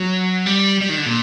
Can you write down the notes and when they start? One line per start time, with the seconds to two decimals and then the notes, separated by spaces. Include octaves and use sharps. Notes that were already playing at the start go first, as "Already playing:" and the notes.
Already playing: F#3
0.46 G3
0.81 G3
0.89 D#3
0.97 D3
1.06 A#2